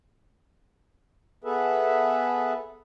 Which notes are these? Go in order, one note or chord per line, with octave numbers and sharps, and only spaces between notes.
B3 G#4 A4 B4 E5